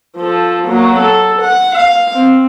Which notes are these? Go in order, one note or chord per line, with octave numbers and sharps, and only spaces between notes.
F3 A4
F#3 A#3
A4
F#5
F5
C4